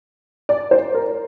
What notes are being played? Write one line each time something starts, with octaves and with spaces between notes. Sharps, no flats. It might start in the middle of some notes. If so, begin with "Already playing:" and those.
D5
C5
A#4